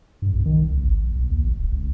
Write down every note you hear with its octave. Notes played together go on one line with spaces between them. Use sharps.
G2
B1
D#3
C2
C#2
G#1
A#1
B1
D#2
A#1
D#1
C#2